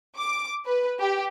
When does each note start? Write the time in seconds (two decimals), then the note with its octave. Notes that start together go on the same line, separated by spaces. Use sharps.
0.18 D6
0.66 B4
1.00 G4